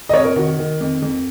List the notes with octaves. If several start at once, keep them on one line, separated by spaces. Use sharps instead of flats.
D#5
F2 C#5
A#4
D#3 F#4
D#3
F2
F2